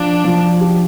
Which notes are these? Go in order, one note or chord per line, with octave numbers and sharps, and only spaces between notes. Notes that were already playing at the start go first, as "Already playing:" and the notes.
Already playing: F3 D4
F3
G4